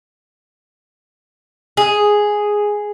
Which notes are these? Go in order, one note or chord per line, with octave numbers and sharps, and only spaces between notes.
G#4